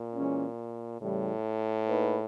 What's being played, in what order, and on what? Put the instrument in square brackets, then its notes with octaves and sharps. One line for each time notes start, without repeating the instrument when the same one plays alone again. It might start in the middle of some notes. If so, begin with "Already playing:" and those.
Already playing: [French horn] A#2
[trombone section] E3 G#3 C#4
[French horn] A2 [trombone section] C#3 E3 G3
[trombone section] A#3 D#4 G#4 B4